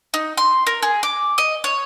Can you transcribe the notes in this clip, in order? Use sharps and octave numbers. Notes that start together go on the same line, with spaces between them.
D#4
C6
A#4
G#4
D6
D#5
C#5